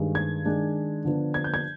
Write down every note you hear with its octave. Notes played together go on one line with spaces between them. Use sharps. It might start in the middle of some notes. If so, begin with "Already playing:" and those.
Already playing: G2 D#3 G#3
G#6
D#3 G#3 D4
D3 F3 B3 D4
G#6
G6
G#6